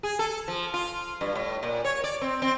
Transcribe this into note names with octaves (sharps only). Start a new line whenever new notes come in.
G#4
A4
F3
F4
G2
A2
A#2
C#5
D5
C4
C4